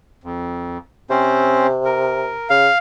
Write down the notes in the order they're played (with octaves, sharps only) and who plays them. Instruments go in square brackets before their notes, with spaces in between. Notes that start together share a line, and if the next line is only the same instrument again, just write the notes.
[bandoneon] F2
[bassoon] C3 [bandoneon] C4 C#4 C5
[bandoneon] A#4
[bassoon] C#3 [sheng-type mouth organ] F5